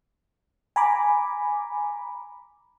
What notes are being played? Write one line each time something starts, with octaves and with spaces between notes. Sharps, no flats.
G#5 A#5 B5 D6